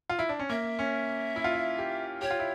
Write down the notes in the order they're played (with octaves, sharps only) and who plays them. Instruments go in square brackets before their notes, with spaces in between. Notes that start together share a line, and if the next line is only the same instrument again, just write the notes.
[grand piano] F4
E4
D4
C#4
[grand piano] A#3 [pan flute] E5
[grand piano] C#4
E4
F4
E4
G4
[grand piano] G4 [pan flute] C#5
[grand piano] F4
E4